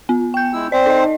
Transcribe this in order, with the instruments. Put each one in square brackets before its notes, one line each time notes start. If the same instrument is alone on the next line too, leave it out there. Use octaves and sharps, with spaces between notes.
[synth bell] B3
G5 G6
[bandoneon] G#3 E4 E6
[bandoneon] C4 C5 [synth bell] D5
[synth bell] D#4 D#5